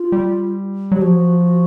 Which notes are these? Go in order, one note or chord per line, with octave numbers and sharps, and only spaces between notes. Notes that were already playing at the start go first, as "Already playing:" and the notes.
Already playing: F4
G3
F#3 G4
F3 F#4